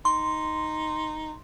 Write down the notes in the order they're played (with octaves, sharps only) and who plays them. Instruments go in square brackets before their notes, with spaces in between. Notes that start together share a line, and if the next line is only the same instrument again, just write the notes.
[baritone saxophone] D#4 [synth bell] C6